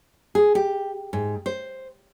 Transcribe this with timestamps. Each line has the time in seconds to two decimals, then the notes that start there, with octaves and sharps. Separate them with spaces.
0.35 G#4
0.55 G4
1.13 G#2
1.46 C5